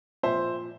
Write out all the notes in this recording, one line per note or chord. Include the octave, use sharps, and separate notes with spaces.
A#2 F3 C5 E5